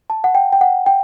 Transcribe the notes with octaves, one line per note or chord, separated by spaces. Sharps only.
A5
F#5
G5
G5
F#5
G5